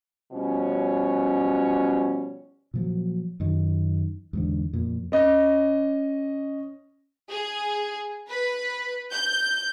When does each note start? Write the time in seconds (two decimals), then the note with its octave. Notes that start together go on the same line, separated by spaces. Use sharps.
0.32 B2 F3 G3 C#4
2.74 A#2 F3 F#3
3.40 F#2 D#3
4.33 E2 G#2 D3
4.73 F2 A#2
5.12 C#4 D#5
7.31 G#4
8.29 B4
9.13 G6